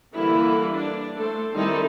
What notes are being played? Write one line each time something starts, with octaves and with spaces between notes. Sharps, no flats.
D3 E3 G3 A#3 E4
D4
A3 A4 C5
D#3 G3 C4 D#4 E4 A4